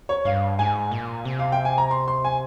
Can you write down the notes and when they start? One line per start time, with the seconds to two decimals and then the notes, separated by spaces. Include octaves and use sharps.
0.09 C#5
0.25 G2 F5
0.59 G#2 G#5
0.91 A#2
1.25 C3
1.39 F5
1.52 G5
1.65 G#5
1.78 A#5
1.91 C6
2.08 C6
2.24 G#5